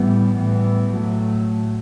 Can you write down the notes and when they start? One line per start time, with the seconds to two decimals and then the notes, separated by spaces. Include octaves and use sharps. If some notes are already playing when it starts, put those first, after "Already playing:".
Already playing: A2 E3 G3 B3
0.33 A2 E3 G3 B3
0.95 A2 F#3 A3